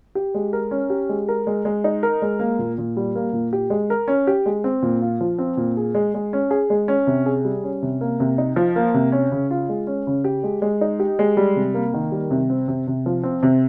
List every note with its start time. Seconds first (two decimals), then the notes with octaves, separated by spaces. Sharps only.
0.15 G4
0.35 G#3
0.53 A#4
0.71 C#4
0.90 G4
1.09 G#3
1.28 A#4
1.47 G#3
1.65 G#3
1.84 D#4
2.03 A#4
2.22 G#3
2.39 A#3
2.59 A#2
2.78 A#2
2.97 G3
3.15 A#3
3.33 A#2
3.53 G4
3.70 G#3
3.90 A#4
4.08 C#4
4.27 G4
4.46 G#3
4.64 C4
4.82 A#2
5.02 F4
5.21 F3
5.38 C4
5.57 A#2
5.77 G#4
5.95 G#3
6.14 G#3
6.33 C#4
6.51 G#4
6.70 G#3
6.88 C#4
7.07 C3
7.26 G#4
7.45 G3
7.64 C#4
7.82 C3
8.01 A#3
8.20 C3
8.38 D#4
8.56 F3
8.76 A#3
8.94 C3
9.12 C#4
9.32 C#3
9.51 F4
9.69 G#3
9.87 C#4
10.07 C#3
10.24 G4
10.44 G#3
10.62 G#3
10.81 D#4
11.00 G4
11.19 G#3
11.37 G3
11.56 C3
11.74 A#3
11.94 D#3
12.12 G3
12.31 C3
12.50 C4
12.68 C3
12.87 C3
13.06 F3
13.23 C4
13.43 C3